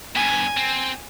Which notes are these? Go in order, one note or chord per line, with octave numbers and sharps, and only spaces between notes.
G2 B2 G#5
C4